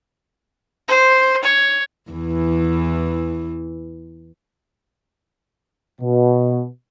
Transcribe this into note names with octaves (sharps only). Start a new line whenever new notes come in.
C5
C#5
E2 E3
B2